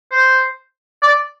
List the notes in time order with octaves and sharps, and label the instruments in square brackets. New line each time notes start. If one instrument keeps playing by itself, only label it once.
[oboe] C5
D5